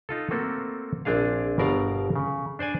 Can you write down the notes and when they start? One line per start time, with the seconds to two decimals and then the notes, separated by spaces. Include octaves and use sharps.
0.09 D#4 F4 A4
0.31 A3 A#3 C4 F#4 A4
1.05 A#1 C4 D4 G#4 F5
1.58 G1 B2 A#4 D5 F5 A#5
2.16 C#3
2.59 D4 C5 D5 G#5